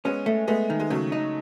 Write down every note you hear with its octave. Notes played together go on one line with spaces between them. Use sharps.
G#3 B3 C#4
A3
G#3 A3 B3
D#3
G#3
C#3 F#3 A3
D#4